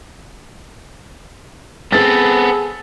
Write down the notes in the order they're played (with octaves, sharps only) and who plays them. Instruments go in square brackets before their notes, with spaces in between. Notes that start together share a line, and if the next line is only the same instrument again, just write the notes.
[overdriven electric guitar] B3 C4 [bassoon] G#4 [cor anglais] A4 [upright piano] A6